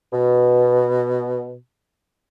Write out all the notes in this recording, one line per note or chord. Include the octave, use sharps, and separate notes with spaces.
B2